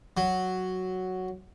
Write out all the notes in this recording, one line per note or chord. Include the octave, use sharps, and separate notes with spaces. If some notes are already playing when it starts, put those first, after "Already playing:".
F#3